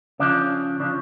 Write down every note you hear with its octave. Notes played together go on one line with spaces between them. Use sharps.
C#3 F3 D4
C#3 F3 D4